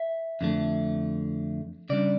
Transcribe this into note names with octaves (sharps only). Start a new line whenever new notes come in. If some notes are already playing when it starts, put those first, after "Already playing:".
Already playing: E5
F2 D3 A3
C#3 G3 D4 D5